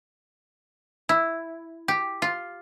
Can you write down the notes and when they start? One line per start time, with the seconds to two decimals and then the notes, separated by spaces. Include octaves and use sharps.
1.09 E4
1.88 G4
2.22 F4